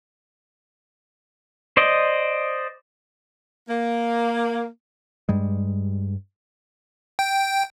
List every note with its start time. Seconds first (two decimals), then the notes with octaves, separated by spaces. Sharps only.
1.77 C5 D5 D#5
3.69 A#3
5.29 G2 G3 G#3
7.19 G5